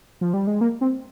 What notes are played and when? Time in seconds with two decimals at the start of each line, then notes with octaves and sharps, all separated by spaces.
0.21 F3
0.34 G3
0.47 G#3
0.61 A#3
0.81 C4